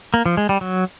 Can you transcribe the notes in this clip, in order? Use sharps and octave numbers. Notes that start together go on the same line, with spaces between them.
A#3
F3
G#3
G3
F#3